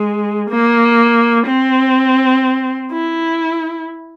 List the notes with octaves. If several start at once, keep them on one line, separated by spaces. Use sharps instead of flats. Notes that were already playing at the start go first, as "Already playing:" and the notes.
Already playing: G#3
A#3
C4
E4